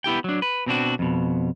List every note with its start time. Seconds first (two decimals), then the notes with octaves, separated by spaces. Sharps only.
0.04 B3 E4 G4 G5
0.24 F#3 D4
0.42 B4
0.66 B2 C4 D4 F#4
0.99 F2 B2